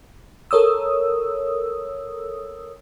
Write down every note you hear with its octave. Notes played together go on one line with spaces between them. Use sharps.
A4 A#4 C#5 D#6 E6